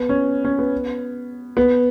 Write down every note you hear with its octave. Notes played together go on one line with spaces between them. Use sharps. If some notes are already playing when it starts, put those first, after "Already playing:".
Already playing: B3
C#4
C#4
B3
B3